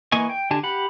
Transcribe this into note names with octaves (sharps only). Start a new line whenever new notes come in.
E3 A#3 D#5 G#5 C#6
G5
D3 D4 G4 G#5 A5
G4 F#5 B5